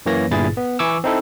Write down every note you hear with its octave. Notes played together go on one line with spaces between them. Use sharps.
F#2 E3 A#3 C#5 A#6
G1 G2 A#2 E4 G#4 A6
B3
E3 E4 G#5 C#6 D6 E6
C4 D#4 E4 A4